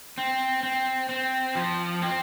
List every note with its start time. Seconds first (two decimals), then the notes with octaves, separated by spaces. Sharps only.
0.18 C4
0.63 C4
1.09 C4
1.55 F3
2.02 C4